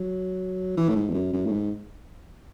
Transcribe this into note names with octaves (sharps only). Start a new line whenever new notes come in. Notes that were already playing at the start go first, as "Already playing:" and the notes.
Already playing: F#3
E3
A2
G#2
E2
F#2
F#2
A2
G#2